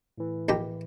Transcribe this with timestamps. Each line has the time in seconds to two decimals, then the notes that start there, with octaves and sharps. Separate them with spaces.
0.18 A2 E3
0.49 A#1 B2 G4